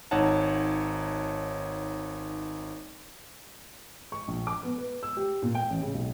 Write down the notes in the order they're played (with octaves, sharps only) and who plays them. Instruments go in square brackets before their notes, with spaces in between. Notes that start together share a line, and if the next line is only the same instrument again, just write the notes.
[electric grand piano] G#1 D#4 C#5 F#5 A5
[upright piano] C#6
A#1
D6
B3
B4
E6
G4
A#2
G5
A1
C#3
B1